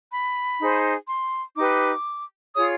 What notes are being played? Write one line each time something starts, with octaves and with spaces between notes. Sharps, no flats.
B5
D#4 G#4 C5
C6
D#4 G4 B4 D6
F4 G#4 C#5 D#6